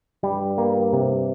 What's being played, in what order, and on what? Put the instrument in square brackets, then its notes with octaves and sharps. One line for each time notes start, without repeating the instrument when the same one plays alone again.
[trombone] G2 [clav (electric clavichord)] G3
[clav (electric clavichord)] A#3
C3